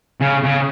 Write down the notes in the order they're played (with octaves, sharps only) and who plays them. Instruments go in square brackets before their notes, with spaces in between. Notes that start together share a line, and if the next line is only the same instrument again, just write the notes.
[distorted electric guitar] C#3
C#3